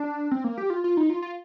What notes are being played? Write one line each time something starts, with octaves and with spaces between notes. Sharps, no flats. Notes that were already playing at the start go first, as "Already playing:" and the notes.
Already playing: D4
C4
A#3
G4
F4
F4
D#4
F4
F4